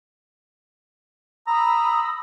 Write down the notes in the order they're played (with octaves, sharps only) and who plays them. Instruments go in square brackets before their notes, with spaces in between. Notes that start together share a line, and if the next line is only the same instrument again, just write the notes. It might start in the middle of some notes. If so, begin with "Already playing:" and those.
[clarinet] A#5 [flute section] B5 D#6 E6